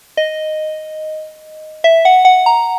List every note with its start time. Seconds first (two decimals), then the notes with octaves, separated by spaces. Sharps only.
0.17 D#5
1.84 E5
2.05 F#5
2.25 F#5
2.46 A#5